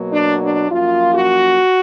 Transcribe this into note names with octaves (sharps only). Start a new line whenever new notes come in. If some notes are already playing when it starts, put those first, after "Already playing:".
Already playing: B2 F#3 A#3
D4
D4
F#2 F3 A#3 F4
F#4